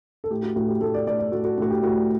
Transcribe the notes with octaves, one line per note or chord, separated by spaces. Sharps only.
A4
A2 G4
F#4
A2 F#4
G4
A2 A4
D5
A2 D5
D5
A2 F#4
F#4
A2 F#4
G4
A2 F#4